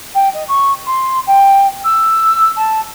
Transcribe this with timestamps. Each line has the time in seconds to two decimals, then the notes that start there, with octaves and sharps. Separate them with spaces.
0.14 G5
0.33 D#5
0.48 C#6
0.86 C6
1.27 G5
1.84 E6
2.56 A5